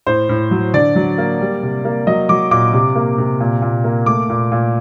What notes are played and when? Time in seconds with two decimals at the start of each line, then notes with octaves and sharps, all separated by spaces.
0.07 A2 C5
0.29 A2
0.51 F#3
0.74 D3 D5
0.96 F#3
1.18 A#3
1.40 G3
1.63 C3
1.85 A#3
2.07 F#3 D#5
2.29 F#3 D6
2.51 A#2 D6
2.73 C3
2.95 A#3
3.18 C3
3.40 A#2
3.62 A#2
3.84 A#3
4.06 A3 D6
4.29 A#2
4.52 A#2